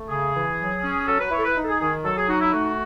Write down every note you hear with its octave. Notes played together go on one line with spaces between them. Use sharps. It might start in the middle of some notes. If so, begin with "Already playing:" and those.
Already playing: A3
C#3 G#4
E3
F#3
C#4
F#3 A4
B4
E4 C#5
A4
B4
D#4
A4
G#4
D#3 G#4
F#3 A4
G#4
D#4 F#4
E4
A3 F#4